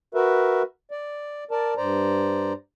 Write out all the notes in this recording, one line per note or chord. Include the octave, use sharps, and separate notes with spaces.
F#4 A#4 B4 E5
D5
A#4 D5 A5
G2 C5 D5 A#5